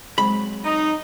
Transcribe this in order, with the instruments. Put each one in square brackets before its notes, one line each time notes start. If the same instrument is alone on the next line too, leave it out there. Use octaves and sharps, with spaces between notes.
[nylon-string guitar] F#3 G#3 C4 [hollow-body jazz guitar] B5
[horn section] D#4